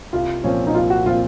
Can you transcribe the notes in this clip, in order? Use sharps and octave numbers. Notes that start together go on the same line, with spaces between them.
C2 F4
A#2 F3 C4 C#4
D#4
C2 F4
F#4
A#2 F3 C4 F4